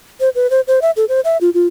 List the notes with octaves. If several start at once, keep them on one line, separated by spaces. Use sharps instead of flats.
C5
B4
C5
C5
E5
A4
C5
E5
F4
F4